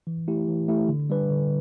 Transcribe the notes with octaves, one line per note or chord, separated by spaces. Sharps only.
E3
A3 E4 G4
E3
A3 E4 G4
D3
G3 D4 B4
D3